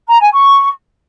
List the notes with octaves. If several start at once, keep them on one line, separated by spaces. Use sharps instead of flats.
A#5
G#5
C#6